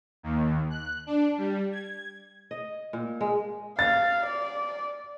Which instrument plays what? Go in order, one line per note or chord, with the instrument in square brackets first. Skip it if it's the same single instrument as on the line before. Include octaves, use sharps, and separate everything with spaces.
[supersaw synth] D#2
F#6
D4
G3
G#6
[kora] D#5
A#2
G#3
[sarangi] F5 [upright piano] A6
[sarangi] D5